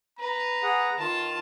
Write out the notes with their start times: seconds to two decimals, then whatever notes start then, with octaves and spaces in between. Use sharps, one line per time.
0.19 B4 A#5
0.63 G#4 F#5
0.98 D#3 F4 A5